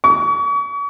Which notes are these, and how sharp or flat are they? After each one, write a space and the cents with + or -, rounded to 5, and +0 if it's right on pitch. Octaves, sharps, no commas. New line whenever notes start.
C#6 +40